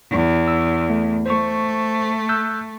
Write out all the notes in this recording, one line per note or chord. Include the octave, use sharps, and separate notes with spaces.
E2
E6
A3
A3 C5 C#6
E6 F#6 G6